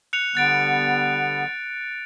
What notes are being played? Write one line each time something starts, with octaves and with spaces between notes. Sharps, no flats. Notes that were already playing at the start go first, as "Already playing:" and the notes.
F#6 C#7 F7
D3 G3 B3 F#6 A6 D7